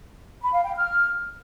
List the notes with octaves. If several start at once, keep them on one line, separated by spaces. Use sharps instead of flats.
B5
F5
G5
F6